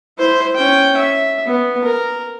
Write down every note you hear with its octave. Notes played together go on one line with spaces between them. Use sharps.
E4 C5
C#4 G5
E5
B3
A#4